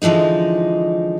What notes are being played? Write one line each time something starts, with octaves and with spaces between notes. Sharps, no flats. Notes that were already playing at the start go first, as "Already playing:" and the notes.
D3 E3 F3 G#3 D#4